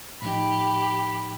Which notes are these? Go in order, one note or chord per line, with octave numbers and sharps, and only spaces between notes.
A2 F3 D#4 G4 B5